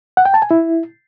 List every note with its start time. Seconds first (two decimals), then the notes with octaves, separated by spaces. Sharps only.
0.17 F#5
0.25 G5
0.34 A5
0.42 G#5
0.51 E4